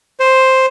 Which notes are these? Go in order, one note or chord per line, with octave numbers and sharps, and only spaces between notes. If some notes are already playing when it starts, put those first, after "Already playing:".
C5